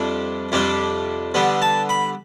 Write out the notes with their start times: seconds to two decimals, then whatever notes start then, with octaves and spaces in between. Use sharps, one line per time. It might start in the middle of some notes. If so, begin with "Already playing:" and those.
Already playing: F2 C3 G3 D4
0.52 F2 C3 G3 D4
1.34 D3 G3 B3
1.62 A5
1.89 B5